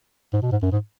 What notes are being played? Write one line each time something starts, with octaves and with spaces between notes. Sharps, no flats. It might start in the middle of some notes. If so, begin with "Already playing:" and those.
G#2
B2
G#2
F#2
G#2